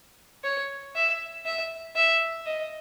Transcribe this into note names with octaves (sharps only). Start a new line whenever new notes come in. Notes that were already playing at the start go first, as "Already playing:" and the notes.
C#5
E5
E5
E5
D#5